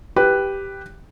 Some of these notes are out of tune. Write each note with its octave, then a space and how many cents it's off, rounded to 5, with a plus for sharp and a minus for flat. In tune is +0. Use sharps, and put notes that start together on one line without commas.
G4 +0 B4 +0